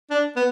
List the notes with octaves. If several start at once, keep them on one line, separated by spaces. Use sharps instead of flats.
D4
B3